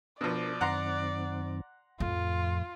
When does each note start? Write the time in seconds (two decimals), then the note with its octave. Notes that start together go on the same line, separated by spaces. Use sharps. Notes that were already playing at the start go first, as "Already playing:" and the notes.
0.21 B2 F3 D4 A#4 C5 D5
0.61 F#2 D#3 C4 F#5 A#5 C6
2.00 F2 A2 F4